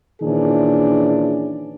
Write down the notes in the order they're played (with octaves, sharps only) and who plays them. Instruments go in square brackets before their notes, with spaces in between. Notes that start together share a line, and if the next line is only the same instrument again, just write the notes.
[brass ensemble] A#2 D#3 E3 C#4 D4 G#4